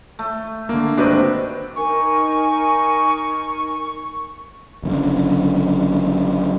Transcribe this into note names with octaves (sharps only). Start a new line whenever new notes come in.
A3
D3 A#3
G#2 C3 D#3 D4 F#4 B4
D#4 A#4 G#5 C#6
F#1 F#2 D3